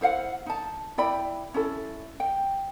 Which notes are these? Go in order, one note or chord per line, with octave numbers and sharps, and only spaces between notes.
E4 C5 F5 F#5
D#4 A5
E4 D5 G5 B5
C#4 E4 A4
G5